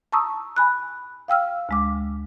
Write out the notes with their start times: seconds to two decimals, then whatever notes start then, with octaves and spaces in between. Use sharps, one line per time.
0.12 A5 A#5 C#6 D#6 E6
0.56 G#5 B5 F#6
1.28 F5 G5 E6 F6
1.69 D2 G#3 D6